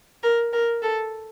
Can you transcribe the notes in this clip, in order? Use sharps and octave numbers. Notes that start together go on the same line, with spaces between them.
A#4
A#4
A4